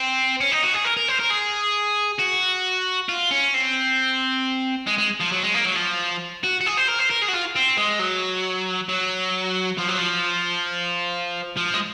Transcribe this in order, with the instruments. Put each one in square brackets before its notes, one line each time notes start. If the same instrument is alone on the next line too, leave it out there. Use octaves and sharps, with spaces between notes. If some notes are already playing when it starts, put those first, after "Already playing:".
Already playing: [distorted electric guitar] C4
C#4
D#4
F#4
G#4
A#4
A#4
C5
A#4
G#4
F#4
F4
C#4
C4
G#3
G#3
F3
F#3
G#3
A#3
F#3
F3
F#4
F#4
G#4
C5
A#4
C5
A#4
G#4
F#4
F4
C4
G#3
F#3
F#3
F3
F#3
F3
F3
G#3